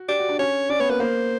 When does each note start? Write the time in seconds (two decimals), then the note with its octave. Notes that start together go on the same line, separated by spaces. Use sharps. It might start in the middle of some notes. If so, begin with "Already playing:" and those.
Already playing: F#4
0.08 G4 D5
0.19 F#4
0.29 D4
0.39 C#4 C#5
0.70 C#4 D5
0.80 B3 C#5
0.90 A#3 B4
1.00 A#3 C5